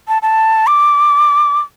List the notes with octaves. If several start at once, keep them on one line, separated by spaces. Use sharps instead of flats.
A5
A5
D6